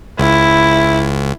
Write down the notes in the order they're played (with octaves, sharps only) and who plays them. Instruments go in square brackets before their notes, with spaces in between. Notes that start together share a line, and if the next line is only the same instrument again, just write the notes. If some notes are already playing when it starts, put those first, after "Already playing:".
[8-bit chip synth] C#2 [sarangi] E4